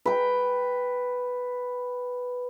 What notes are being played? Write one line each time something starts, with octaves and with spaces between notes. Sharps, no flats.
B4 G5